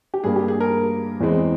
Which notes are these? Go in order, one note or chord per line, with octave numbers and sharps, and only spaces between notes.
G4
G2 G3 A#3 G#4
G4
G#4
A#4
E2 E3 G#3 C4